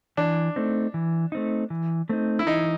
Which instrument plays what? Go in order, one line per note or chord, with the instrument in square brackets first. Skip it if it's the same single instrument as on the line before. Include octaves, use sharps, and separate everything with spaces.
[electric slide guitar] E3 [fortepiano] D4
[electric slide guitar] A3 C4 D#4
E3
A3 C4 D#4
E3
A3 C4 D#4
[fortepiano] E4
[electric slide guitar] E3 [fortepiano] D#4